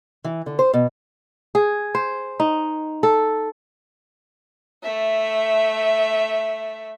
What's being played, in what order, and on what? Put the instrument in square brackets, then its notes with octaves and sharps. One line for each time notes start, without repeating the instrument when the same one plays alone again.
[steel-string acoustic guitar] E3
D3
C5
B2
[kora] G#4
C5
D#4
A4
[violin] A3 E5